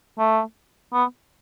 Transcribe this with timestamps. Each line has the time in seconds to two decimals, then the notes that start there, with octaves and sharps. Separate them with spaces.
0.19 A3
0.93 B3